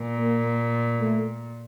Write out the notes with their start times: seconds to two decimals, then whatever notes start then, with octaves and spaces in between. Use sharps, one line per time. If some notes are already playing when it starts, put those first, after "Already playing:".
Already playing: A#2
0.16 A#3
1.00 A3